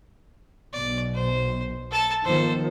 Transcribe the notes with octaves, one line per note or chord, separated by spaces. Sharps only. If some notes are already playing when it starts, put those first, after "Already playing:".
B1 B2 D5
C5
A4 A5
D#3 F3 B3 A4 C5